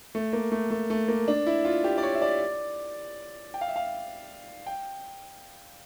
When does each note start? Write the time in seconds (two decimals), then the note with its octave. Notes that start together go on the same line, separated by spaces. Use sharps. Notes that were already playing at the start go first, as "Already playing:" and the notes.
0.15 A3
0.33 A#3
0.52 A3
0.70 A3
0.90 A3
1.08 A#3
1.28 D4
1.46 E4
1.65 F4
1.84 G4
1.98 D5
2.03 C#5
2.15 E5
2.22 D5
3.54 G5
3.61 F5
3.68 E5
3.76 F5
4.66 G5